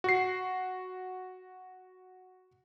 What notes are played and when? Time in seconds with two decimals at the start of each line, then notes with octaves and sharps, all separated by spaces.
0.04 F#4 C7